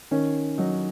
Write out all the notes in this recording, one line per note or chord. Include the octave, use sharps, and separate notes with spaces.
D#3 C#4
F#3 D#4